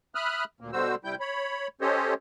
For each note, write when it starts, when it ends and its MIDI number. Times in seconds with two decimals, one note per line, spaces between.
0.15 0.44 76
0.15 0.44 83
0.15 0.44 87
0.15 0.44 89
0.15 0.44 90
0.61 0.71 38
0.61 0.71 46
0.61 0.71 58
0.73 0.95 47
0.73 0.95 50
0.73 0.95 55
0.73 0.95 66
0.73 0.95 72
0.73 0.95 88
1.04 1.15 48
1.04 1.15 55
1.04 1.15 64
1.04 1.15 79
1.04 1.15 91
1.20 1.67 73
1.20 1.67 83
1.81 2.14 61
1.81 2.14 67
1.81 2.14 69
1.81 2.14 72
1.81 2.14 73
1.81 2.14 75